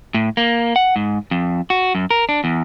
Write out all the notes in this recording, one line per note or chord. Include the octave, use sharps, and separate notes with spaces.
A2
A#3
F#5
G#2
F2
F#4
F#2
A#4
D4
E2